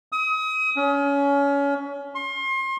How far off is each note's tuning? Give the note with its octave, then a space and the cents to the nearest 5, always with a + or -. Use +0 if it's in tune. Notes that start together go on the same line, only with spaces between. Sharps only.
D#6 +35
C#4 +25
C6 +35